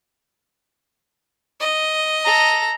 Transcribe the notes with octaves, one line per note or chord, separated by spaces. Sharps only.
D#5
A4 A#5